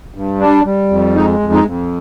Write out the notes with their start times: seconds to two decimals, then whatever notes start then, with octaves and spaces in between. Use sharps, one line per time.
0.15 G2
0.40 G3 D4
0.65 G3
0.90 F2
1.15 G#3 D#4
1.40 F2
1.53 D#4
1.65 F2